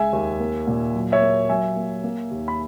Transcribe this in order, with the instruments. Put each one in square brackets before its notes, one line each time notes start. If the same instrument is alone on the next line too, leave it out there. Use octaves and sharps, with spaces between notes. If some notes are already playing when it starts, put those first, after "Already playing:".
Already playing: [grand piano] C#2 G#3 E5 G#5
D#2
A#3
A#2
F#3
C#5 E5
A#3
F#3 E5 G#5
A#3
A#3
D#2
B5